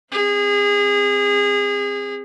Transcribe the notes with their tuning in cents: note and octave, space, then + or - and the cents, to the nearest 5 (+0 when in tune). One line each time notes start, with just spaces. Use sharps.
C4 +0 G#4 -30